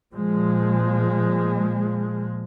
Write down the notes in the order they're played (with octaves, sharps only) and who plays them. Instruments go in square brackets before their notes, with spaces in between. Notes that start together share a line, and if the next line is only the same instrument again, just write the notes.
[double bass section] A#2 F3 G#3